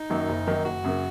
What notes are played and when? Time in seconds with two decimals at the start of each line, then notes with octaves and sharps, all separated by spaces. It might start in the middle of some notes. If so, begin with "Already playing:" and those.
Already playing: D#4
0.10 F#2 D#3 F#3 A#3
0.29 F#1
0.47 F#2 D#3 F#3 A#3
0.65 F#1 F#4
0.84 F#2 C#3 A#3